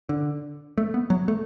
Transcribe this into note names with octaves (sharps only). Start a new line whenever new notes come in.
D3
A3
B3
F#3
A3